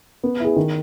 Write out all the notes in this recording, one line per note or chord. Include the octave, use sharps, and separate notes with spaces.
B3
E4 G#4
D#3